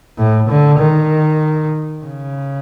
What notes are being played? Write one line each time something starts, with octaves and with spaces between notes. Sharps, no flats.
A2
D3
D#3
C#3